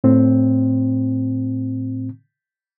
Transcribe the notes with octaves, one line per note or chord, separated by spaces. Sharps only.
A2 C4